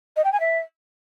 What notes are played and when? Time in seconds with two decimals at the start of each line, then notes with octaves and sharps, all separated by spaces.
0.16 D#5
0.24 G5
0.32 G#5
0.40 E5